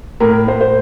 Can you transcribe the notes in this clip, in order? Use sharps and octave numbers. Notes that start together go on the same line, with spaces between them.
A2 A#4
A2 C5
C5